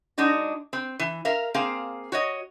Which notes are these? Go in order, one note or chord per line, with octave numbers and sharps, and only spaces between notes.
G#3 D4 D#4 F#4
C4
E3
A#4 E5 F5
A#3 C4 G#4 F5
F#4 C#5 D#5